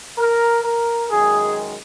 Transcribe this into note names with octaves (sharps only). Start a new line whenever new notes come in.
A#4
A#4
F#2 D#3 G#3 G#4